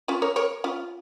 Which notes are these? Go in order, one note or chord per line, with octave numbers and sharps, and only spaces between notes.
C#4 F4
A#4 C#5
A#4 C#5
C#4 F4